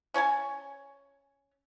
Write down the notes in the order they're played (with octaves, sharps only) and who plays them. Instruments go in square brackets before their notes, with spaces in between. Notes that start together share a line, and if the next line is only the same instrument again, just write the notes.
[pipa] C#4 C#5 G#5 A5